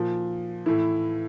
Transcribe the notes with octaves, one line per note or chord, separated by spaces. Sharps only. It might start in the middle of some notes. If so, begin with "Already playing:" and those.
Already playing: A#2 F3
A2 E3 E4